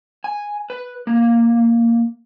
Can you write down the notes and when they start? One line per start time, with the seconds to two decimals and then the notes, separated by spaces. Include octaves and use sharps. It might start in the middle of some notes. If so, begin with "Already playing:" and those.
0.24 G#5
0.70 B4
1.07 A#3